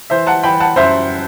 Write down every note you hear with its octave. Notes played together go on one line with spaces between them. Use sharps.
E3 C5 E5
F#5 A5
E3 G5 B5
F#5 A5
F#2 C5 E5